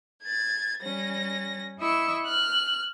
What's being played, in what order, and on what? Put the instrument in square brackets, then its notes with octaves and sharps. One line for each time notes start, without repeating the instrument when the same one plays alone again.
[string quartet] G#6 A6
G3 C#4 A#6
E4 D#5 C#6 E6
F6 F#6